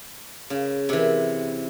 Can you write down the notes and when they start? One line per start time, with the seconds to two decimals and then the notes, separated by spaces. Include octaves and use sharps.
0.50 C#3
0.89 C3 E3